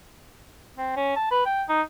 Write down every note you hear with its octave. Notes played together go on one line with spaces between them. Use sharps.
C4
C#4
A5
B4
G5
D#4